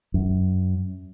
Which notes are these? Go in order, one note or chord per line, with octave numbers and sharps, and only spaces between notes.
F#2